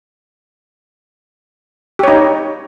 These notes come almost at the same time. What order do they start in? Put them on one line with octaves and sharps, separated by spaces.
G4 C#5 D#4